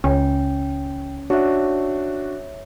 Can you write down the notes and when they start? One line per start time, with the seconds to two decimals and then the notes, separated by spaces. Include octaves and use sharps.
0.04 C#2 C#4 G5
1.30 D4 F#4 C#5 E5